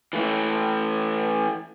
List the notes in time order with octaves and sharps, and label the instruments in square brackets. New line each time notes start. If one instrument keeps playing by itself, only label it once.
[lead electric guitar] E3 A3